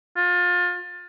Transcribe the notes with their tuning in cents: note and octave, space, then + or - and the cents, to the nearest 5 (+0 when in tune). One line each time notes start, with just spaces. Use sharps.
F4 +30